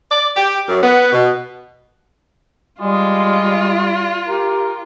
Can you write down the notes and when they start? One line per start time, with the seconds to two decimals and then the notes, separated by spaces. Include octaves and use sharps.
0.10 D5
0.35 G4
0.69 F#2
0.82 B3
1.12 B2
2.81 G3 G#3 F4
4.28 G4 A#4